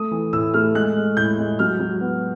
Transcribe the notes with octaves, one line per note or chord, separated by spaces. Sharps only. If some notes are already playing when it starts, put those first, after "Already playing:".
Already playing: A3 D#6
E3
A2 E6
A3 F6
G#3 F#6
G#3
A2 G6
G#3
F#3 F6
F#3
B3